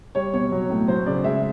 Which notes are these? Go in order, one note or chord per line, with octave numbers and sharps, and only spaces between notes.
G3 C#5
B2 C#5
F#3
A2
F#3 C5
C#3 D5
G#3 E5